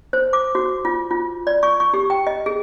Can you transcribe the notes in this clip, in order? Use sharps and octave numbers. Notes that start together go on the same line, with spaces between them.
C5
D6
F#4
F4
F4
D5
C#6
C#6
G4
G5
D#5
G#4